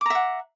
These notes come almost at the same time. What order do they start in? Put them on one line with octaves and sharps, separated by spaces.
D6 A#5 E5 F#5